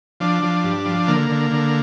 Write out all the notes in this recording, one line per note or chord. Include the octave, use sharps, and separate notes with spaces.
F3 D4
F3
G2
F3
D3 A#3
D3
D3